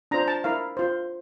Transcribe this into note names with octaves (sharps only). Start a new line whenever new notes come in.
D4 F4 C5 A#5
A5
E4 A#4 F5
F4 C5